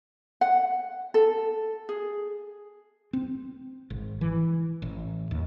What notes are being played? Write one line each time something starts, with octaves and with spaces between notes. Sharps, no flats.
F#5
A4
G#4
C4
G#1
E3
A1
D#2